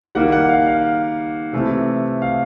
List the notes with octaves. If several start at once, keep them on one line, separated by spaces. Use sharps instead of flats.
D#3 G3 A#3 F#5
F#5
F5
F5
C3 E3 A3
F5